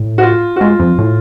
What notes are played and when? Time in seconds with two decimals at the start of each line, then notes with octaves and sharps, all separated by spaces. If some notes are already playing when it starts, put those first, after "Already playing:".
Already playing: A2
0.18 F#4
0.22 F4
0.56 F#4
0.61 G#2 F4
0.80 F2
0.99 A2